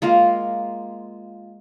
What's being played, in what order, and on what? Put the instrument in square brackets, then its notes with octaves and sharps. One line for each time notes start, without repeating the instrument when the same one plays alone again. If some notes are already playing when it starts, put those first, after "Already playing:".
[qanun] G#3 A#3 F4 A#4